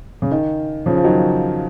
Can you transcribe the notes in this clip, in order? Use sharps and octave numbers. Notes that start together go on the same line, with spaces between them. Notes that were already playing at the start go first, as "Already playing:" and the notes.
C#3
D#3
C#3 F3
F3
D#3 F#3